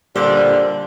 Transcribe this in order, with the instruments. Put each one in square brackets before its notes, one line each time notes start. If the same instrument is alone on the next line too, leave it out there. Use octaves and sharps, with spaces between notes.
[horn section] A#2 D3 G3 [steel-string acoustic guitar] C5 D5